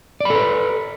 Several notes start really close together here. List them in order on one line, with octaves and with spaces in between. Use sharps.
D5 B5 A4 B4